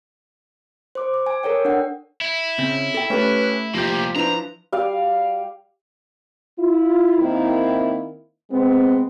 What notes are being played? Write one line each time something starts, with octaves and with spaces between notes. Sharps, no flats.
C5 D6
D6
G#5
A4 A#4 C#5 G5
D4 F#5
E4
C#3 C4 C#4
A4 G5
A3 C#4 G4 A4 B4
C2 F3 A#3 G4 G6
D4 E4 B4 C5 A#5
G3 F5
E4 F4
D#3 A#3 C4 E4
C3 G#3 B3 C4